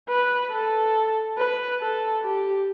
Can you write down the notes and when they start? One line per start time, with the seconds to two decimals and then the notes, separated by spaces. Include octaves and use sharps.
0.09 B4
0.51 A4
1.38 B4
1.81 A4
2.23 G4